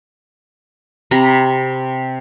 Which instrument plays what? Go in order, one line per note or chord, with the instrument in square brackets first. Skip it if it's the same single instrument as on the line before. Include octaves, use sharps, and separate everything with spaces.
[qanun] C3 A#5 B5